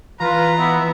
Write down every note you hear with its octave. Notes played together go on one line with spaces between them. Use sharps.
E3 F4 B4 A#5
B3 E4